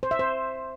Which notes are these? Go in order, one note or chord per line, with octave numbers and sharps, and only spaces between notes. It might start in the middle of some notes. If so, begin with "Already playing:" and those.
C5
E5
C5